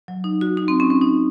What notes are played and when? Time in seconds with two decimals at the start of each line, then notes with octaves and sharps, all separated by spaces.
0.08 F#3
0.24 D#4
0.41 F#4
0.57 D#4
0.68 C4
0.80 C#4
0.90 C#4
1.01 D#4